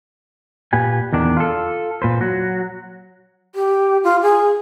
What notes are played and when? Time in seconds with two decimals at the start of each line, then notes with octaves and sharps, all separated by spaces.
0.73 A#2 G4 B4 G#5
1.13 E2 D#3 D4
1.37 F4 A4
2.02 A#2 B4 C5
2.21 F#3 F#4
3.55 G4
4.04 F4
4.22 G#4